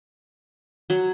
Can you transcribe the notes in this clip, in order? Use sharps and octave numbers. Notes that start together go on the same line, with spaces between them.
F#3